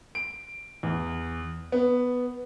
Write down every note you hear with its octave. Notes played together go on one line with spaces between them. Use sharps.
D7
E2
B3